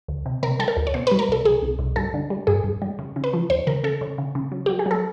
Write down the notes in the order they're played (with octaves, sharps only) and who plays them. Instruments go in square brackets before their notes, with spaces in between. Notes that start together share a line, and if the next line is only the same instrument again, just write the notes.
[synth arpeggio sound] D2
C3
C3 A#4
G3 A4
A#4
D2
C#5
B2 C5
B4
G3
A#4
C2 A4
C2 G#4
C2
C2
G2 A4
D3
G3
G2 G#4
G2
G3
C#3
C#3
B4
F3
D#2 C5
C#3 A#4
C#3 A4
C#3
C#3
C#3
F#3
F#3 G4
G#4
F#3 A4